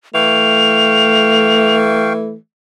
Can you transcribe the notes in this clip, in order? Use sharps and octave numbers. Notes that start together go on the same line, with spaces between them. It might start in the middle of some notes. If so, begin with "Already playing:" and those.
E3 A3 F5 G5 C#6 F7